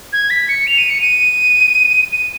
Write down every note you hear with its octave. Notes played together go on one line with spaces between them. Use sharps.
G#6
B6
C#7
F7
D#7
C#7
D#7
D#7